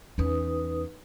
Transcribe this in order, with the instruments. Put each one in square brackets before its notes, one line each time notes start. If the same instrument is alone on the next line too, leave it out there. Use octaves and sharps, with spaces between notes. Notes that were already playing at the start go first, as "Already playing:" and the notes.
[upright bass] E2 C#4 [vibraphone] D#4 B4 D#6